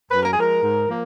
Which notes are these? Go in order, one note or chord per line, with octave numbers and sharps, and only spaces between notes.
F#2 B4
A#4
G#4
F3 G#3 A#4
G#2
F3 A#3